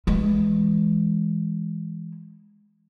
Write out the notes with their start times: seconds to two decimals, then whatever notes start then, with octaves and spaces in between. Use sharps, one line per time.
0.07 E3 G#3